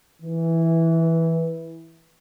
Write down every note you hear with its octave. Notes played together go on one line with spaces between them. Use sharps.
E3